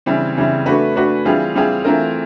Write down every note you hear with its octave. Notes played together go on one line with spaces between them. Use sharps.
C#3 E3 G3 C4
C#3 E3 G3 C4
A3 D4 F#4 B4
A3 D4 F#4 B4
E3 G3 C4 F4 G#4
E3 G3 C4 F4 G#4
E3 A3 C4 F4 A#4